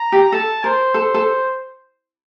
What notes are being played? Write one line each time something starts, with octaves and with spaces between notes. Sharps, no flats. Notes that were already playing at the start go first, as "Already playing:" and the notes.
Already playing: A#5
G4
A4 A5
A#4 C5
A4 C5
A4